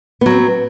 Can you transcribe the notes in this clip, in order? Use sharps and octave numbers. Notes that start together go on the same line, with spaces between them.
F#3 B3 C4